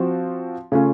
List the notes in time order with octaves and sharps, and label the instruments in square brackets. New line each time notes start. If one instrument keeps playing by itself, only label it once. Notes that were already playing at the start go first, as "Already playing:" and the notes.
Already playing: [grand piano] F3 C4 F#4
C#3 A3 C#4 F4